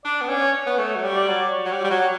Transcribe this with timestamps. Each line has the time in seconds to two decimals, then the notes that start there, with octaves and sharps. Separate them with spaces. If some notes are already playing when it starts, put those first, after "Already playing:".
0.05 D4 D5
0.21 B3
0.29 C#4 D5
0.42 C#5
0.67 B3
0.78 A3 C#5
0.96 F#3
1.03 G3
1.16 D5
1.28 F#3
1.53 C#5
1.66 F#3
1.72 G3
1.84 G3
1.90 F#3